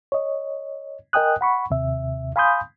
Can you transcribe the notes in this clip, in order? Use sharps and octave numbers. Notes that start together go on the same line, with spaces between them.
C#5 D#5
A#4 D#5 G5 G#5 D#6 F#6
F#5 B5 C#6
D#2 C3 E5
F5 G#5 B5 C6 D#6 G6